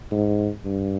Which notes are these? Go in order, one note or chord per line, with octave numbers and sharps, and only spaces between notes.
G#2
G2